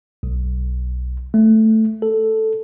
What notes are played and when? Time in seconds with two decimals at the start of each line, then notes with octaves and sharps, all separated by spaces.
0.23 B1
1.34 A3
2.02 A4